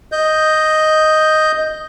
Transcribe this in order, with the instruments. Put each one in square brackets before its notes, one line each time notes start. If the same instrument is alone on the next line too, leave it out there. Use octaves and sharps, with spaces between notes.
[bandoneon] D#5 G6